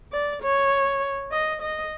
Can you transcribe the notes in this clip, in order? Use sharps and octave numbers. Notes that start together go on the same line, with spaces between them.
D5
C#5
D#5
D#5